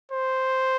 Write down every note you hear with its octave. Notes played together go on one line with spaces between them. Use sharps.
C5